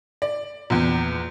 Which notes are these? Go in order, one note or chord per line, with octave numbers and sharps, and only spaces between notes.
D5
A#1 E2